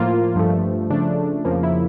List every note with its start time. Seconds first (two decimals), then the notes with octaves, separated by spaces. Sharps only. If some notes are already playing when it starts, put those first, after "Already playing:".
Already playing: A2 F3 A#3 F4
0.36 G2 F3 A3
0.90 C#3 F3 A3 D4
1.45 F2 C#3 F3 A#3
1.63 E4